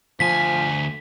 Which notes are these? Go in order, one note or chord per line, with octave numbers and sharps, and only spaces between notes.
D2 F3 G#5 B6